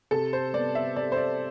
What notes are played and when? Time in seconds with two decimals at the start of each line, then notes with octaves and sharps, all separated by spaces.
0.11 C3 A4
0.33 C5
0.53 G3 B3 D5
0.75 E5
0.96 C3 D5
1.12 C5
1.17 D5